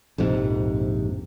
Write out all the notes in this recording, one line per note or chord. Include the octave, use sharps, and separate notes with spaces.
A#1 F2 G#2 C3